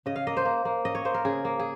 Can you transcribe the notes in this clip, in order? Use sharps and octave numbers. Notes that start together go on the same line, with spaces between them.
C#3 D#5
F5
A#3 D#5
C5
A#3
A#3
C#4 D#5
C#5
A#3 C5
A#4
C#3 G#4
A#3
G#4